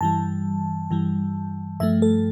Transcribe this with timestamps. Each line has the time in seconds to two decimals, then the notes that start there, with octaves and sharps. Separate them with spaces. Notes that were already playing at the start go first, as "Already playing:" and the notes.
0.01 G2 E3 G3 A5
0.91 G2 E3 G3
1.80 G2 F3 A3 E5
2.02 A4